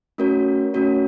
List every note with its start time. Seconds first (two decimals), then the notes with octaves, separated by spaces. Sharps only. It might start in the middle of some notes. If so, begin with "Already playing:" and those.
0.18 A3 C#4 F#4 A#4 C#5
0.74 A3 C#4 F#4 A#4 C#5